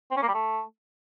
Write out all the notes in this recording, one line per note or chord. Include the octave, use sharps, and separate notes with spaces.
C4
C#4
A#3
G3
A3